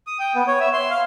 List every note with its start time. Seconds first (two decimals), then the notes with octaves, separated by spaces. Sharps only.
0.07 D#6
0.19 G5
0.35 B3
0.48 C#5
0.60 E5
0.73 C6
0.90 F5